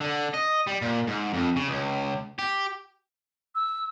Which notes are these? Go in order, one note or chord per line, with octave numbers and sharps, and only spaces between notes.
D3
D#5
G3
A#2
G#2
F2
C#3
C#2
G4
E6